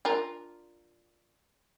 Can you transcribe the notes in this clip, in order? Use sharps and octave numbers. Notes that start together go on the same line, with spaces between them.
D4 F4 A#4